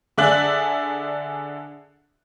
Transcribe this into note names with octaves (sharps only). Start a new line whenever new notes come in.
D3 G#4 D5 E5 F#6 F#7